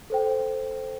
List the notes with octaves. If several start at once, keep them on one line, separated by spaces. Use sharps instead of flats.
A4 C5 G5